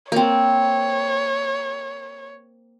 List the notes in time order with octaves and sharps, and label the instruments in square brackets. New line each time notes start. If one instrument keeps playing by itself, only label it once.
[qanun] A#3 C4 [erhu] C#5